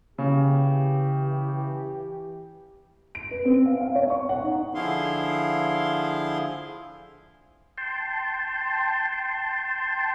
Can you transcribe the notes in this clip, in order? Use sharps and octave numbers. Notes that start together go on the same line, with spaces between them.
C#3 E3 G4
D7
B4
C4
F5
F5
C#5
C#6
F#5
D#4
D3 F3 E4 G#4 F5 C6
G5 A5 C6